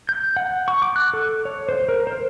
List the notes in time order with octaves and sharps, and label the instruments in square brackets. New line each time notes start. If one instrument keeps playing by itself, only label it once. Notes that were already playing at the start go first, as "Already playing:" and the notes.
[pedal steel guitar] G6
F#5
C#6
D6
F#6
A4
C#5
C5
A#4
C5